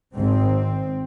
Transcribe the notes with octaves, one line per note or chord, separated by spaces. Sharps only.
G#1 G#2 C4